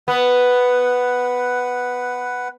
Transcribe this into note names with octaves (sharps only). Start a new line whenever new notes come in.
B3 B4 F#5